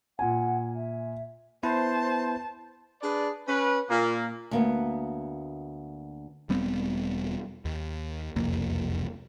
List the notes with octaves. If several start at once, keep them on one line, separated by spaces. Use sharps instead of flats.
A#2 F#5 G#5
E5
B3 E4 B4 C5 A5
D4 G#4 B4 D5
C#4 B4
A#2 A#3
D2 A#3 B3
E1 G3 B3 C4
D#2
E1 C2 F2 A#3